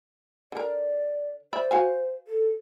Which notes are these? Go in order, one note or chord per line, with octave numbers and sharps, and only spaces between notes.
D3 A#4 D5
C5 D5 E5 B5
F#4 F5 G#5
A4